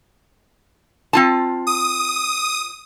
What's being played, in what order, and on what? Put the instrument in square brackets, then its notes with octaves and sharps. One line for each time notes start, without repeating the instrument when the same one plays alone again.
[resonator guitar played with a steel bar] C4 F4 A5
[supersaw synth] D#6